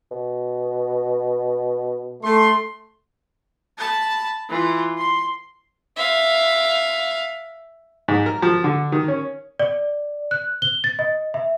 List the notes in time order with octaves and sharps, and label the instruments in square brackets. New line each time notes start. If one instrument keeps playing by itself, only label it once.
[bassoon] B2
[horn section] A3 C6
[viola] A5 B5
E3 F4
C6
[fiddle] E5 F5
[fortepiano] G#2
A#4
F3
D3
D#3
C#4
[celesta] D5
F#6
G7
A6
D#5
E5